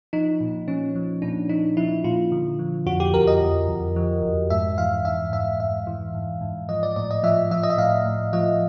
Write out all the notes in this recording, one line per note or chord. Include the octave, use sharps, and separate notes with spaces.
F3 D#4
A#2
F3 C#4
F3
A#2 D4
F3 D#4
F3 E4
A#2 F4
D3
F3
F2 F#4
G4
F2 A#4
D#5
F2
F2
F3
F2
G#2 E5
E3 F5
G#2 E5
G#2 E5
G#2 E5
E3
G#2
G#2
F3 D#5
D5
A2 D5
D#5
F3 E5
F3 E5
D#5
E5
A2 F5
A2
F3 D#5